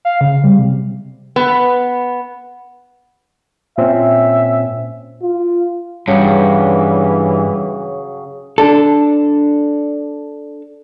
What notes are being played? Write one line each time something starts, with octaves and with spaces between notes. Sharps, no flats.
F5
C#3
G3
C3
B3
A#2 C4 C#4 E5
F4
G2 C#3 E3 F#3 C#5 G5
D4 A4